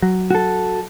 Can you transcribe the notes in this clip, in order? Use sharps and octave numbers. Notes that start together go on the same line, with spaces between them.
F#3
F#4 A4